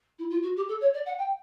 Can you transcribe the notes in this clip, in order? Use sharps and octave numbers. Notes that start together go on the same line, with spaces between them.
E4
F4
F#4
G4
A4
C#5
D5
F#5
G5